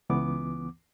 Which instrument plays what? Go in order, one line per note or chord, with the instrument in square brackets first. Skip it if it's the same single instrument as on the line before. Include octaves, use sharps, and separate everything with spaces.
[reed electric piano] C#2 E3 B3 D6